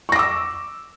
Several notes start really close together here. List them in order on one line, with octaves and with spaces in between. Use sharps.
C#6 A#6 D6 E6